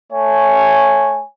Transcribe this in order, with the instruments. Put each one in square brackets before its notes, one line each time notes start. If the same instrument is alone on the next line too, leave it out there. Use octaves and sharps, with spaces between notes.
[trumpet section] A3 C#5 G#5